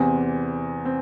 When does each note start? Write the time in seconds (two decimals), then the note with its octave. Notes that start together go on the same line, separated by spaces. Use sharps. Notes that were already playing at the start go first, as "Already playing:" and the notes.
Already playing: E2 C3 E3 C4
0.85 C4